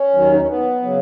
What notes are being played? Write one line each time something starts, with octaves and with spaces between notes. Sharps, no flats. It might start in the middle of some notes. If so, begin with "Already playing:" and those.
Already playing: C#4
D#2 D#3 F#3
D#4
C#4
B3
C#3 F#3